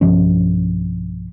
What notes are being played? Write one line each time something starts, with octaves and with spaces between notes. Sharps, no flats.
B1 G2 F3 C#4